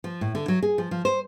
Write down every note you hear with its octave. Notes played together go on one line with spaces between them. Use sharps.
F3
A2
D3
F#3
G#4
F3
F3
C5